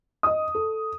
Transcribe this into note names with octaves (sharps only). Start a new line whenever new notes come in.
D#5 D#6
A4